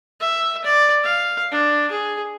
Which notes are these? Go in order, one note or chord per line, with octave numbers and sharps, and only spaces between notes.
E5
D5
F5
D4
G#4